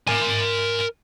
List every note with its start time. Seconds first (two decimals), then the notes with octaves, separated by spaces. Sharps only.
0.08 A#4 G#5